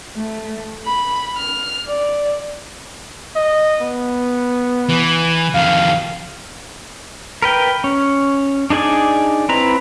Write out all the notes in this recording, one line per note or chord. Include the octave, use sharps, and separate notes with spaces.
A3
B5
F6
D5
D#5
B3
E3
F2 D#3 F5
A#4 B4 G5
C#4
D4 D#4 G#4 D5 G#5
C4 E4 B4 A#5